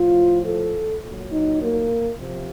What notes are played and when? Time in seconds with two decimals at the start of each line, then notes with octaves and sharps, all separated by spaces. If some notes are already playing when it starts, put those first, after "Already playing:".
Already playing: A2 F3 F4
0.45 A4
1.03 A#2 F#3
1.31 D#4
1.60 A#3
2.18 C3 F3